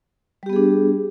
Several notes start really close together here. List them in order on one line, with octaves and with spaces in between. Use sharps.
G3 G4 B3 G#4 D4